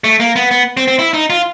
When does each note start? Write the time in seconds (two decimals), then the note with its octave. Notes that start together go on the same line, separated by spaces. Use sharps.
0.04 A3
0.20 A#3
0.36 B3
0.51 B3
0.77 C4
0.88 C4
0.99 E4
1.13 D#4
1.30 F4